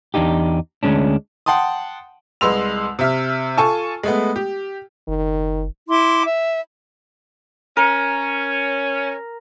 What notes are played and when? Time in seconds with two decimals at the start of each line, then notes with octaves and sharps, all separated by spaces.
0.14 E2 D4 D#4 G4
0.83 D2 G#2 G#3 C#4 D4
1.46 F#5 G5 A5 C6 D#6
2.41 C2 G#3 B4 C6 E6 F7
2.99 C3 E5 F6
3.58 F4 A4 G#5 A5 C#6
4.03 G#3 A3 B3
4.36 G4
5.08 F#1 D#3
5.89 E4 C6 D6
6.24 E5
7.77 C#4 A#4